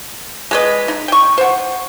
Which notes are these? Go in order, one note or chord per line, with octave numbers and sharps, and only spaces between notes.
G#3 B4 D#5
D#4
G5 C#6
C5 F#5